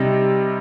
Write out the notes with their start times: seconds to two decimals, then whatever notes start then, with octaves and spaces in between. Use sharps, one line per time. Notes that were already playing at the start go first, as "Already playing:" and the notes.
Already playing: C3 G3 D#4